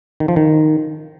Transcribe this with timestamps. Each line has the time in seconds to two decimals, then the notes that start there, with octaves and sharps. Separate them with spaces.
0.20 D#3
0.28 F3
0.36 D#3